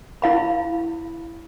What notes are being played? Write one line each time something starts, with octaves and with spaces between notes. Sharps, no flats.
E4 F5 B5